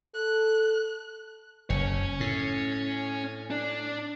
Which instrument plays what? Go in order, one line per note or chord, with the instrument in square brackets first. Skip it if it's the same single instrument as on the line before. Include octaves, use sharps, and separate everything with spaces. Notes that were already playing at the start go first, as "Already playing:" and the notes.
[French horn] A4 [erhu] F#6
[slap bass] F#1 [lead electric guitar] C#4 C#5
[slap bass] A2
[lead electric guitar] D4